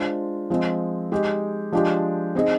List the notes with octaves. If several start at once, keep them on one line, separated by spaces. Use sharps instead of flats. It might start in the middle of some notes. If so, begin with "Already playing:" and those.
Already playing: G#3 D4 F4 C5
F3 G#3 C4
G#3 D#4 G4
F3 G#3 D4 G4
C4 D#4 G#4 D#5